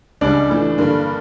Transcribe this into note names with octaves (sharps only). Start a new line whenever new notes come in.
C#2 C#3 G3 D4
A2 E3 A3
G2 D3 G3 A#3